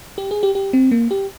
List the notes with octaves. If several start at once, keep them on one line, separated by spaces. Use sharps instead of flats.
G4
G#4
G4
G4
C4
A#3
G4